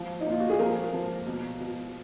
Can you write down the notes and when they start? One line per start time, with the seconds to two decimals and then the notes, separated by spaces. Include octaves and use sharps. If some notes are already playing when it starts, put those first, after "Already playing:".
Already playing: F3
0.21 D#4
0.26 A#2 F4
0.40 F#4
0.50 G#4
0.59 F3 A#4
0.93 F3
1.26 B2
1.60 B2